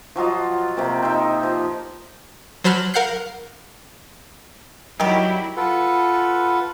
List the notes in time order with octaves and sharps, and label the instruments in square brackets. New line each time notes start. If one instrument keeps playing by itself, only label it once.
[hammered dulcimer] F3 F#3 F4 D#5
C3 A#3 C4
D#4 C5 E5 G5
F3
[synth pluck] F#3 C5 A5 B5 F6 F#6
A#4 F5 F#5 F#6 G6 C7
[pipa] D#3 G3 G4 [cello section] F#3 E4
[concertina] F4 A4 B4 F#5